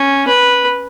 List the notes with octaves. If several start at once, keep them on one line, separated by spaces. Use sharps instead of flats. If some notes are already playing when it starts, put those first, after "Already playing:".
Already playing: C#4
B4